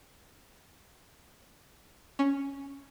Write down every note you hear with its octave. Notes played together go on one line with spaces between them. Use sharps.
C#4